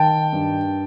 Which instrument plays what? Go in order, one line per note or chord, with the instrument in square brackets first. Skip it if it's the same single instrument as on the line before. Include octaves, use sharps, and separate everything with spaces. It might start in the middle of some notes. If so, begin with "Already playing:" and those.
Already playing: [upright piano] D#3 G5 A5
G2